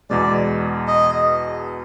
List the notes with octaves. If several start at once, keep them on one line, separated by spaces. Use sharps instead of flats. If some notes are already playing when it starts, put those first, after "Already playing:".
E2 B2 G#3 D5
D#5